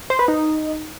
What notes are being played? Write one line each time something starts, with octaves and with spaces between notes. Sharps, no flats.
C5
B4
D#4